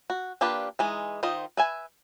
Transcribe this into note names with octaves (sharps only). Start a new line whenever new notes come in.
F#4
A#3 D4 F4 G4 B4
E3 G#3 D#4
D#3 F4 C5 D#5
B4 E5 G#5